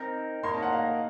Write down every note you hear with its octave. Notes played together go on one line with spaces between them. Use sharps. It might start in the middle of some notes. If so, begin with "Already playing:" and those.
Already playing: C4 D#4 A#4
A#3 D#4 A#4 C#5 C6
A5
F#5
F5